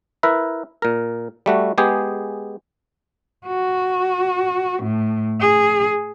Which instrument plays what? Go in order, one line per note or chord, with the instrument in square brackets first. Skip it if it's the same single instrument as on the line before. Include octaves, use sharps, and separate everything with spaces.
[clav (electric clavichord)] E4 A#4 B4 E5
A#2 A#4
G3 A3 F#4
G#3 B3 G4 G#4
[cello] F#4
A2
G#4